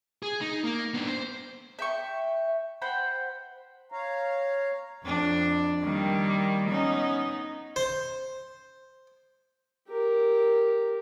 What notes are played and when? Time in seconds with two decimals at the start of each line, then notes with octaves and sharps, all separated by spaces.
0.23 G#4
0.41 D#4
0.64 A#3
0.94 B3 D4
1.08 C5
1.79 E5 G5 C#6
2.82 C5 F#5 G5 B5
3.92 C#5 F5 A#5
5.04 F2 D4
5.83 D#3 G3 A#3
6.68 B3 C#4 D#4
7.76 C5
9.89 G4 A#4